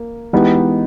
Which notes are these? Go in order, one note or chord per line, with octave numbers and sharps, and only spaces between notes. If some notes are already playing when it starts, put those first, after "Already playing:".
Already playing: A#3
E3 G#3 B3 D#4 G4